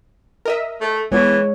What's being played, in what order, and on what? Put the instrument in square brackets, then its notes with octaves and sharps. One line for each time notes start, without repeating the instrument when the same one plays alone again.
[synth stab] A#4 D#5 E5
[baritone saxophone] A3
[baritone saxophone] E3 [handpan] G#3 C#5 [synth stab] B3